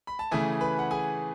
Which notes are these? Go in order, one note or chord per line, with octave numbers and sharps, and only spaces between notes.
B5
A5
C#3 E3 A3 G#4 G#5
B4 B5
F#5
G#4 G#5